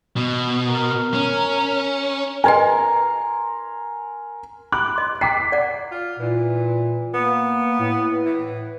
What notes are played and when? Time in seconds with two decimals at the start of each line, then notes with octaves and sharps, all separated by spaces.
0.17 B2
0.66 A#4
1.14 C#4
2.44 G#4 A#4 B4 D#5 G#5 C6
4.72 B5 D6 F#6
4.96 D#5 C6
5.21 D#5 G5 A#5 D6 B6 C7
5.52 D5 F#5
5.91 F4
6.19 A#2 E3
7.14 A#3 B3
7.79 A2
8.26 E3